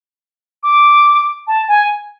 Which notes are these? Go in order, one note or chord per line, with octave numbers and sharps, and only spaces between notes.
D6
A5
G#5